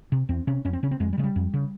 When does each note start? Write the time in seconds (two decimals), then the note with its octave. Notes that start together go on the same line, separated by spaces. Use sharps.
0.12 C3
0.29 E2 C4
0.47 C3 C#4
0.65 F2 C#4
0.73 C4
0.83 C#3 C#4
0.91 C4
1.00 F2 G#3
1.13 G3
1.18 C#3 G#3
1.24 G3
1.36 F2
1.54 C#3